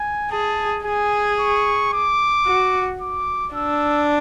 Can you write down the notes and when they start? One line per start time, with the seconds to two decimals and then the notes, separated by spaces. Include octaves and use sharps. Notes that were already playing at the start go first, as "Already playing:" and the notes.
Already playing: G#5
0.31 G#4 A5
0.85 G#4 G#5
1.39 C#6
1.93 D6
2.47 F#4
3.01 D6
3.55 D4 E6